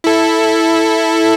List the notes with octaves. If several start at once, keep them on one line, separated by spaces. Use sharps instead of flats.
E4 A4